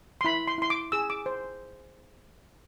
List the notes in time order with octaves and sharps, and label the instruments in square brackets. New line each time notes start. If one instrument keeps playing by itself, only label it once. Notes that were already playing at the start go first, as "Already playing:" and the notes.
[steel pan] C6
E4 B5
C6
E4 C6
D6
G#4 E6
D6
C5